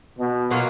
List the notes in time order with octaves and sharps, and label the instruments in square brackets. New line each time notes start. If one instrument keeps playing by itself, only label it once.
[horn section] B2
[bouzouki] B2 F#3 A#3 F4